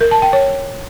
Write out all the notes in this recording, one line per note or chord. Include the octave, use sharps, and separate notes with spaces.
A#4
A5
G5
C#5